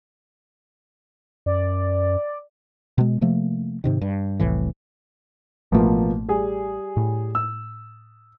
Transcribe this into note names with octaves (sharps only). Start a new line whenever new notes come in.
F#2 D5
B2 G#3
C3 F3 A3 A#3
G#2 C3 D#3
G2
F1 C2 A2 E3
A1 B2 F3 A3 A#3
G3 G#4
A2
E6